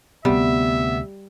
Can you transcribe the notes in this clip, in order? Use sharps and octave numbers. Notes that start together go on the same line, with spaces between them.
D2 C3 G3 B3 E5